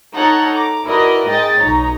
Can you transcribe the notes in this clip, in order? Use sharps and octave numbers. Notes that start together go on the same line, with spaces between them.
D#4 A4 C#5 F#5 A5 A#5
A#5 D6
E4 F#4 A#4 B4 D5 D#5
G#2 G#3 D#5 G5 A6
B1 D#4 C#5 A#5